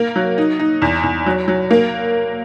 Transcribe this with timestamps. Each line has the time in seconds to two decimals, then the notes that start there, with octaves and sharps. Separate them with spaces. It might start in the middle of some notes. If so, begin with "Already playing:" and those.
Already playing: A#3
0.16 F#3
0.38 D#4
0.60 D#4
0.82 E2
1.03 E2
1.26 F#3
1.48 F#3
1.71 A#3